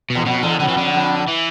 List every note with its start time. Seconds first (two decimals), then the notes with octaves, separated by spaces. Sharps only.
0.10 B2
0.15 E2
0.26 F2 B2
0.43 E2 D3
0.60 F2 D3
0.68 E3
0.77 D3
0.94 F2
1.28 E3